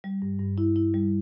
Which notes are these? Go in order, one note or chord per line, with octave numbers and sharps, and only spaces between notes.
G3
G2
G2
E4
E4
G3